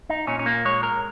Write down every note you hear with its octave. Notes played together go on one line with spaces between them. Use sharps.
D#4
A#2 C#4
C#4
A#3
G#3 C#5
A#4